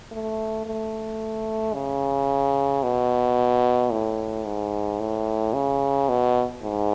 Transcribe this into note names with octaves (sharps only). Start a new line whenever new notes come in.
A3
A3
C#3
B2
A2
G#2
A2
C#3
B2
G#2